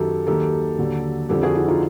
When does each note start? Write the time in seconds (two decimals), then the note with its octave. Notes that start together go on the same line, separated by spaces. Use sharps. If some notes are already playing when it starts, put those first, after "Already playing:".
Already playing: F#2 D#3 F#3 G4 A4
0.27 D#2 D#3 F#3 G4 A4
0.78 D#2 D3 F#3
1.29 F2 D3 F3 G4 A4
1.43 F#4 G#4
1.55 E4 F#4
1.68 D#4 F4